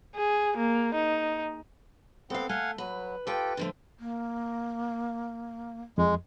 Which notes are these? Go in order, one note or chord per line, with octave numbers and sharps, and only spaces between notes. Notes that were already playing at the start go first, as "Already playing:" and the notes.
G#4
A#3
D#4
B3 C4 A4 F5
A3 F5 F#5 G#5
F#3 B4
F4 G4 A4 B4 G5
D3 F3 A3
A#3
F2 G#3